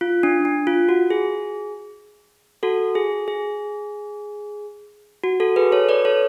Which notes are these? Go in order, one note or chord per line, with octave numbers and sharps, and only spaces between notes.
F4
D4
D4
F4
F#4
G#4
F#4 A4
G#4
G#4
F#4
F#4 A4
G#4 B4
A4 C#5
B4 D5
A4 C#5